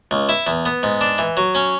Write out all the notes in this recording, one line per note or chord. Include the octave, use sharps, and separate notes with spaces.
C#2
E4
E2
B3
G#2
D4
E3
F#3
C#4